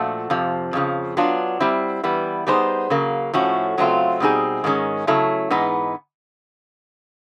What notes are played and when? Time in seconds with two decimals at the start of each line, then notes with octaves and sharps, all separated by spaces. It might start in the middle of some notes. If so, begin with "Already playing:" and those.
Already playing: A#2 F3 A3 D4 F#4
0.30 F2 C3 F3
0.73 F2 C#3 F3
1.17 F#3 B3 D4 F4
1.60 G3 C4 E4
2.04 E3 G3 B3
2.47 G3 B3 D#4 G#4 C5
2.90 C#3 F#3 A#3
3.34 A2 F3 A3 C#4 F#4
3.78 C#3 F#3 A3 C4 F4
4.20 B2 G3 C4 D#4 G#4
4.64 G#2 D#3 G#3 C#4
5.07 C#3 F#3 A3 C#4 E4
5.50 G#2 E3 G#3 B3 D#4